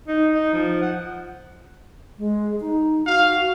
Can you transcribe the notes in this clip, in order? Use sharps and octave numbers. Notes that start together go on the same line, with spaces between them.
D#4
D#4
F3
F#5
G#3
D#4
F#4 F5